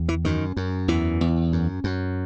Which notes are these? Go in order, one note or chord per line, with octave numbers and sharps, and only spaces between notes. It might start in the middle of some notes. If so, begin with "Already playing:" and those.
Already playing: E2
E3
F#2 D#3
F#2
E2 E3
E2
F#2
F#2